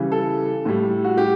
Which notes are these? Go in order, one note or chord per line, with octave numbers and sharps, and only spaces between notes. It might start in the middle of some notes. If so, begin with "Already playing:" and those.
Already playing: C#3 E3 G3
A4
A2 G3
F#4
G4